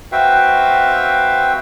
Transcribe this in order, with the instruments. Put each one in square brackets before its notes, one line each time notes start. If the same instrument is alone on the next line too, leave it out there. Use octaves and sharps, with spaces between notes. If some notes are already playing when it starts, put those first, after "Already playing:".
[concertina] C4 F#4 B4 E5 F5 G5